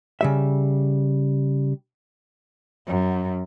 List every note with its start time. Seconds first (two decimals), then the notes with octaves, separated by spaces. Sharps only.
0.21 C#3 G3 E5
2.87 F#2